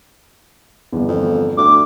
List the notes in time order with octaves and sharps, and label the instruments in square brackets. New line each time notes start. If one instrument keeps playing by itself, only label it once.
[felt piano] G1 E2
[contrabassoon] F2
[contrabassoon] D2 [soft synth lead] D6